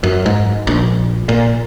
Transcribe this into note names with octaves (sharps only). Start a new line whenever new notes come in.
F#2
G#2
A#1
A#2